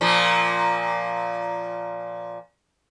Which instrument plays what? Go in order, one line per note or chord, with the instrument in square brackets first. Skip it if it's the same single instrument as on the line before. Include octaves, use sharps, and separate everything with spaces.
[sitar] A#2 F3 A#3